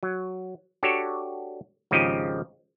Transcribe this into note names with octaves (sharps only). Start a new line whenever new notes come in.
F#3
D4 F#4 G4 A4 C#5
G#1 C#3 F3 D#4 G4 D#5